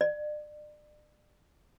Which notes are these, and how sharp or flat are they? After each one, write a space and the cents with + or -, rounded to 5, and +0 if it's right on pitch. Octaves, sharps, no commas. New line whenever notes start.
D5 +35